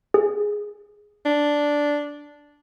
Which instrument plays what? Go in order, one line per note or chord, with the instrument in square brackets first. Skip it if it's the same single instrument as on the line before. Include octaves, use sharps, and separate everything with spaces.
[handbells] G#4
[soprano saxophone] D4